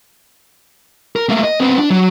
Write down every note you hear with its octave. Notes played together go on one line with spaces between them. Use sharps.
A#4
A3 A#3
D#5
B3 C4
D4
F#3